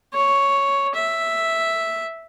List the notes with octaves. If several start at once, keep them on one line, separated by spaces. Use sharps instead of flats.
C#5
E5